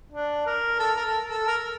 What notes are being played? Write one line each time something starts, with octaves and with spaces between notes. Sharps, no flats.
D4
A#4
A4
A#4
A4
A4
A#4